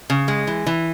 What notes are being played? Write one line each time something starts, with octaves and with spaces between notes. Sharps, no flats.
C#3
G#3
E3
E3